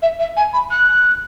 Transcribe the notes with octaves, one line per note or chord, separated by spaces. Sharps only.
E5
E5
G#5
B5
F#6